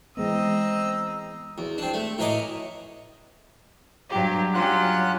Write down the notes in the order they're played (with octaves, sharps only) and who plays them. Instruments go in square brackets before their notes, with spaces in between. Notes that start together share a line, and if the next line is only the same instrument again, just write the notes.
[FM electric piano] E3 G#3 B3 [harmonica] C4 E6 [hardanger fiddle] D#5 A#5
[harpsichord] E2
C4 D4
A3
A2 E3 A#4 C#5 D#5 D6
[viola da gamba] G2 F#3 G4
[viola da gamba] F#3 C#4 G4 [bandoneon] F4 F#5 F#6